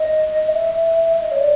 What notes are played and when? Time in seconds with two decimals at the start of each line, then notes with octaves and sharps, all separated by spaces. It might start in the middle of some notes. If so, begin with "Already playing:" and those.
Already playing: D#5
0.48 E5
1.14 E5
1.23 D#5
1.31 C#5
1.39 D5